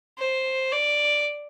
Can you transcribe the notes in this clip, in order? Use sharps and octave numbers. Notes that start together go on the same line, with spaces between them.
C5
D5